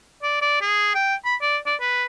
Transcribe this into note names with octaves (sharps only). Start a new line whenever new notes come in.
D5
D5
G#4
G5
B5
D5
D5
B4